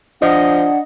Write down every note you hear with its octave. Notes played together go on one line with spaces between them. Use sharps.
F3 D4 D#5 F#5